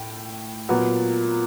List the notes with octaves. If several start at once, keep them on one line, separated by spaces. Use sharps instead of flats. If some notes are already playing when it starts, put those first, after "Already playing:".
Already playing: A2 G5
A#2 F#3 B3